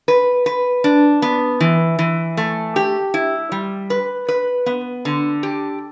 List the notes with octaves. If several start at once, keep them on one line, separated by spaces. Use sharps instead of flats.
B4
B4
D4
B3
E3
E3
A3
G4
E4
G3
B4
B4
B3
D3
G4